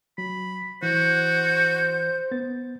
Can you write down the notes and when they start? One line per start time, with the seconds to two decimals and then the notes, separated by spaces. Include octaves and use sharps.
0.18 F#3 B5
0.83 E3 F#4 C5 G6
2.31 B3 A6